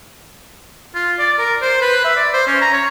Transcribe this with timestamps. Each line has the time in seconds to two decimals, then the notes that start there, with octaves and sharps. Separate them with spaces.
0.95 F4
1.19 D5
1.39 A#4
1.62 C5
1.81 B4
2.04 E5
2.16 D5
2.33 C5
2.47 C#4
2.61 A#5
2.73 C#5